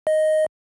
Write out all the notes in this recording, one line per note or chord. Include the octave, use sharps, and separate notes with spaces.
D#5